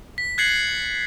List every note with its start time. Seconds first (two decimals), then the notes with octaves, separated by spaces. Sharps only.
0.18 B6
0.38 F#6 G#6 A6 C7 C#7 F#7